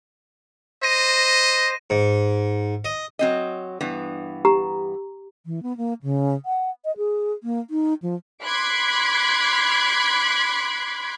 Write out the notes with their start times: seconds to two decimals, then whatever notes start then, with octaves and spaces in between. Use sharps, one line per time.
0.83 C5 D#5 A#6 D#7
1.90 G#2
2.85 D#5
3.19 F#3 C4 D#5
3.81 G2 E3 B3
4.45 G4 A#5
5.46 E3
5.63 B3
5.77 A#3
6.03 C#3
6.46 F#5
6.85 D#5
6.97 G#4
7.43 A#3
7.70 D#4
8.02 F3
8.44 B5 C6 D6 F#6 G#6 B6